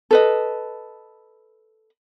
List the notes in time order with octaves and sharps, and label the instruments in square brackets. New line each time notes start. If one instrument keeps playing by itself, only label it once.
[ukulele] A4 B4 D#5